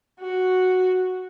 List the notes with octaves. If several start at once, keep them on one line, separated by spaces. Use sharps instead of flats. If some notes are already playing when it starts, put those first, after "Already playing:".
F#4